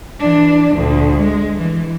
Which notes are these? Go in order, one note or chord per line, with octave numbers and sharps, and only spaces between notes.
E3 D4
D2 A#2
G#3
E3